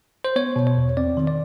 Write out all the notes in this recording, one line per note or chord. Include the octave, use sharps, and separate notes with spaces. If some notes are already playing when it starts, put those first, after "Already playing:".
C5
B3 C#5
B2
C#5
E2
C4 D5
D#3
D5